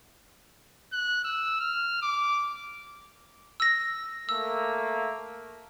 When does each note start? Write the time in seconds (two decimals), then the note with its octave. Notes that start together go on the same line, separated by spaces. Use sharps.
0.92 F#6
1.24 E6
1.60 F6
2.02 D6
3.60 E6 A#6
4.29 A3 A#3 E6